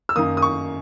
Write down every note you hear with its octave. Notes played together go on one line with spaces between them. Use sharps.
E6
F#2 D#3 A#3 D#6
D#6
C#6